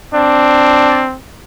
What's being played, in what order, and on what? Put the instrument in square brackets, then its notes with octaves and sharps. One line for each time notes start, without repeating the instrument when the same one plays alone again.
[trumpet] C4 [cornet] D4